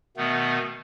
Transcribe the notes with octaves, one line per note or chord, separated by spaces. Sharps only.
B2 D#3 A3 B3